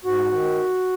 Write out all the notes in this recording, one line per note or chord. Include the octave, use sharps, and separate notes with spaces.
G#2 F#4
D#3